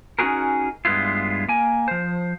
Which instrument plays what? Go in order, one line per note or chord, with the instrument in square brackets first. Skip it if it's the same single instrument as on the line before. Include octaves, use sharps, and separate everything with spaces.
[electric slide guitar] C#4 D#4 F4 F#4 G#4 A#4
G2 G#3 B3 E4 F4
A#3 G#5
F3 C5